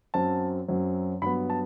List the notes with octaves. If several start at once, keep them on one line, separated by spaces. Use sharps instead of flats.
F#2 F#3 C4 A5
F#2 F#3 C4
G2 F#3 B3 B5
A5